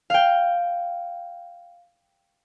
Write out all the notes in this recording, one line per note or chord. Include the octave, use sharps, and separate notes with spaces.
F5 G5